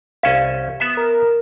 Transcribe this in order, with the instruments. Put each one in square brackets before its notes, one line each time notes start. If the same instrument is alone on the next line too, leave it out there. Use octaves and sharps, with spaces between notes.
[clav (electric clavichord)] C2 C#4 E5 [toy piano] F5
[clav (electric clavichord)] B3 E5 [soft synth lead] D#6
[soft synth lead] A#4